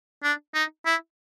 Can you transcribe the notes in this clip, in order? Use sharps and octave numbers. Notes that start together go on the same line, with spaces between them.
D4
D#4
E4